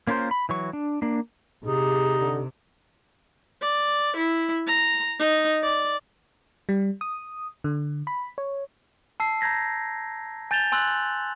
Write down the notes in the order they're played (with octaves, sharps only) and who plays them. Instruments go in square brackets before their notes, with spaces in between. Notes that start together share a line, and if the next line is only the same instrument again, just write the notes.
[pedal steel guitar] A#3 C#4 F4 A#4 C5
B5
E3 F#3 C#6
D4
A#3 D4
[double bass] C3 [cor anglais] D#4 [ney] G4 [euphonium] G#4
[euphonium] D3
[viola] D5
E4
A#5
D#4
D5
[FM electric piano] G3
D#6
D3
B5
C#5
[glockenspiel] A5 E6 C7
A#5 G6 G#6 A#6 B6
G#5 G6 A6 E7 F7 G7
G#5 C6 E6 F#6 F#7